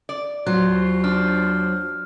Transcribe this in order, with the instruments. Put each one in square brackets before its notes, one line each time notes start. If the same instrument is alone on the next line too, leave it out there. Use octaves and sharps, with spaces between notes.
[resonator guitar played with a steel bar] D5
[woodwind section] D#2 F4 C5 [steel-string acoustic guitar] F#3 [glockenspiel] F#6
[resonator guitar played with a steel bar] D4 [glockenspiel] F6